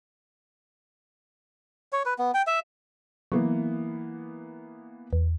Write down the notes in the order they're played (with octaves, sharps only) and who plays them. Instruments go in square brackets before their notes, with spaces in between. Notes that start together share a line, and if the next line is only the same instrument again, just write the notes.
[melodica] C#5
B4
B3
G5
E5
[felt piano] E3 A#3 B3 [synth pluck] F#3
[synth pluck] E2